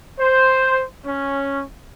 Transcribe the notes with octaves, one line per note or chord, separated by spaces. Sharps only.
C5
C#4